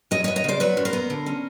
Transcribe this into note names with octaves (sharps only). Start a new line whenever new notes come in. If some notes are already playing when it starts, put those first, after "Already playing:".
F#2 C#5 D#5
C#5 D#5
B3
C#5 D#5
C#3 C5 D5
F#3 B4 C#5
F#2
A#4 C5
B3
D3
C#4